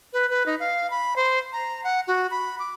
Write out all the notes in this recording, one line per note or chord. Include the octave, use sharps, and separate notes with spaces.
B4
B4
D#4
F5
B5
C5
A#5
F#5
F#4
B5
D6